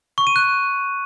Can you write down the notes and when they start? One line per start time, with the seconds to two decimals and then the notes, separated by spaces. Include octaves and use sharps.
0.18 C#6
0.27 D#7
0.36 F#6